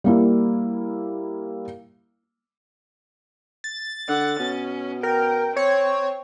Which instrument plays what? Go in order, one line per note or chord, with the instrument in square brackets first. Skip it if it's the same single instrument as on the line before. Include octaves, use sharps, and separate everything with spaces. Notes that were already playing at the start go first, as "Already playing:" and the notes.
[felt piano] G3 A#3 E4
[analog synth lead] A6
[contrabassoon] D3 [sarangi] F#5
[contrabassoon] B2 [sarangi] C#4
[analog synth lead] A#4 [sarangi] G5
[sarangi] C4 [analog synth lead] C#5